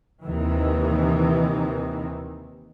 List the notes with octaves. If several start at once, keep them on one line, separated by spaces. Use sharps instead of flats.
D#2 C3 D#3 E3